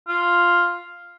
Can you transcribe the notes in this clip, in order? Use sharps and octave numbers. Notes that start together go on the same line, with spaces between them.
F4